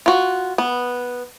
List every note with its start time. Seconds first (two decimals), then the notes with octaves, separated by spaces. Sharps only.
0.06 F4 F#4
0.58 B3